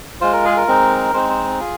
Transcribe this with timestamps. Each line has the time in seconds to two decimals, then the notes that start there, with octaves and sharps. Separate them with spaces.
0.21 G#3 F4 C5
0.33 A#4
0.45 G#4
0.57 A#4
0.67 G#3 C4 D#4
1.14 G#3 C4 D#4 C5
1.30 C5
1.60 F4 G#4